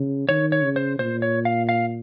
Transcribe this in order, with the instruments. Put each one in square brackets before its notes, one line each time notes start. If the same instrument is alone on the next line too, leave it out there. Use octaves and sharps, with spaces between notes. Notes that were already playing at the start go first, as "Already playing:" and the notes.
Already playing: [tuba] C#3
[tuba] D#3 [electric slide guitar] C#5
[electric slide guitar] C#5
[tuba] C#3
[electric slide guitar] C5
[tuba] A#2 [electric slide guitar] C5
[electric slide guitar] C#5
F5
F5